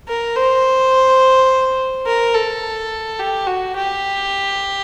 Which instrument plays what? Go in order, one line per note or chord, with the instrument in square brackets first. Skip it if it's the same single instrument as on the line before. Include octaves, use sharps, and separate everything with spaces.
[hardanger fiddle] A#4
C5
A#4
A4
G4
F#4
G4